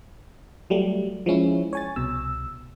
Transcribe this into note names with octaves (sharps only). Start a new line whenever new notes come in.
F#3 G3 A3
F3 G#3 C#4 E4
C#5 G#5 A6
C2 B2 E6